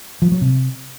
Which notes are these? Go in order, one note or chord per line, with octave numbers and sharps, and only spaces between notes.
F3
F#3
C3